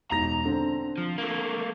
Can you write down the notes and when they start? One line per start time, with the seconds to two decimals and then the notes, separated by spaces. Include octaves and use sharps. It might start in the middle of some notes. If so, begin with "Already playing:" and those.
0.11 E1 D#4 A#5 A#6
0.45 D3 C4
0.98 F3
1.18 A3 A#3